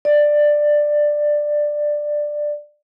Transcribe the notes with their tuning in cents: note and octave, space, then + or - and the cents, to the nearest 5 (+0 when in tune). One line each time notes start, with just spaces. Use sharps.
D5 +10